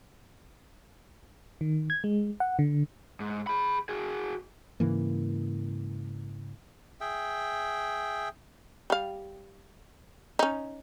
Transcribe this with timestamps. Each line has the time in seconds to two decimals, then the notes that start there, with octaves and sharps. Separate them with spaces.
1.61 D#3
1.90 G#6
2.04 G#3
2.40 F#5
2.59 D3
3.20 G#2
3.47 G#4 B5
3.89 F#4 G#4
4.80 G#2 C#3 E3 A#3
7.01 G#4 E5 G5
8.90 G3 F5
10.39 C#4 D#4